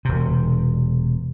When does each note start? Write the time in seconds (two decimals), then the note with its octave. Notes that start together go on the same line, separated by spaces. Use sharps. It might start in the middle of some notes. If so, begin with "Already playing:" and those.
0.05 E1 C3